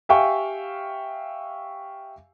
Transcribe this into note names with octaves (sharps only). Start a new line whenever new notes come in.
G4 E5 F5 G5 G#5 C#6